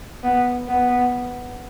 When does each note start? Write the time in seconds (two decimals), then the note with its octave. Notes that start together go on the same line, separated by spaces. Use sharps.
0.23 B3
0.69 B3